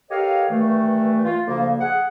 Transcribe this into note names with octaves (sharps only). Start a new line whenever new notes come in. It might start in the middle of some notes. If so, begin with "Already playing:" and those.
G4 A4 A#4 C#5 D#5 F5
G2 D#3 E3 A3
F4
D2 C#3 F3 A#3
G#4 F#5